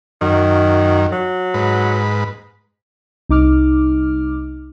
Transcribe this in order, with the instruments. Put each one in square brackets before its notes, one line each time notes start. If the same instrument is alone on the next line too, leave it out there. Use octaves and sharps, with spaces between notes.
[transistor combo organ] F#2 [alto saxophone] D#3
[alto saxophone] F#3
[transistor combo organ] G#2 B4
[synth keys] C2 D#4 D6 F6